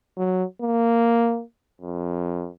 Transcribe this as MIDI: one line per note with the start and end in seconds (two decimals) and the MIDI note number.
0.17 0.44 54
0.62 1.42 58
1.81 2.49 41